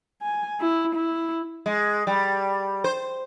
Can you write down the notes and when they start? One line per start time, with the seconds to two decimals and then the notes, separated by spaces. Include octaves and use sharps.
0.23 G#5
0.61 E4
0.95 E4
1.66 G#3
2.07 G3
2.84 C5